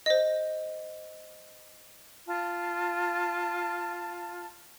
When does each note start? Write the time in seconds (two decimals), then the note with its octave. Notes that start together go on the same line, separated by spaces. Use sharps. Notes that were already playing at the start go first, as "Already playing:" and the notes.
0.06 C5 D#5
2.27 F4 A5